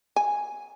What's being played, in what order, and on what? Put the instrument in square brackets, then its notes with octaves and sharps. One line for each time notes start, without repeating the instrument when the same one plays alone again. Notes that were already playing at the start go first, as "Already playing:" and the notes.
[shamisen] G#5